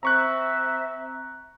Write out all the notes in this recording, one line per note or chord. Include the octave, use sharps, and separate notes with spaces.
C4 E5 A#5 C#6 F#6